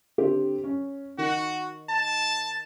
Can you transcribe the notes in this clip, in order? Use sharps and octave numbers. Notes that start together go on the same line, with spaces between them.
D3 C4 G4
C#4
D#3 F#4
A5